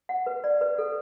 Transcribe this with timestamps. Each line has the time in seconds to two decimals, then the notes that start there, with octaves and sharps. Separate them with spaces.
0.09 F#5
0.26 B4
0.44 D5
0.61 B4
0.78 A4